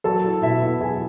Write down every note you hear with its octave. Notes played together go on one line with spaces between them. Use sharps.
F#3 A4 A5
E4
B2 E4 E5
B3 E4 E5
F#3 G#4 G#5